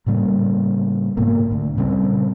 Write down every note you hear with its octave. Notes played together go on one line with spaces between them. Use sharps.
A2 C#3 G3 A#3
G#2 B2 A#3
D2
A#2 C#3 G3 C4